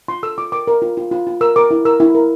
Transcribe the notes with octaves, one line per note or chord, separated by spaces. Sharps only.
F4 C6
A4 E6
F4 D6
A#4 D6
A#4
F4
F4
F4
F4
A#4 E6
A#4 D6
E4
A#4 E6
E4
A#4